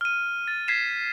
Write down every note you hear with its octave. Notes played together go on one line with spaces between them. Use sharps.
F6 D#7
A6
G#6 B6 C7 E7